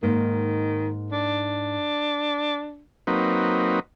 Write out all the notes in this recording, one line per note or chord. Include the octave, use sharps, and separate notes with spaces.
G#2 D#3 A#3
D4
F#3 A#3 C4 D#4 B4